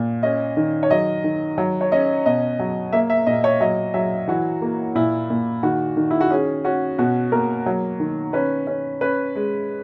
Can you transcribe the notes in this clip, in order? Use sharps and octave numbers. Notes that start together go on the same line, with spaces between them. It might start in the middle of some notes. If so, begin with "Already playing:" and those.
Already playing: A#2
C#4 D#5
D#3
C#5
F#3 D#5
D#3
F#3
C#5
C#4 D#5
B2 D#5
F#3
A#3 E5
E5
A#2 D#5
C#5
F#3 D#5
F#3 E5
E3 F#4
A#3
A#2 E4
A#2
D#3 F#4
D#3
E4
F#4
C#4 G#4
C#4 F#4
B2 F#4
A#3 A#4
F#3
D#3
C#4 B4
C#4
C#4 B4
G#3